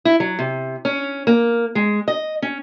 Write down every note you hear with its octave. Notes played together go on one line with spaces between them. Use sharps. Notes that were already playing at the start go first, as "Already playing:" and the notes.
E4
F#3
C3
C#4
A#3
G#3
D#5
C#4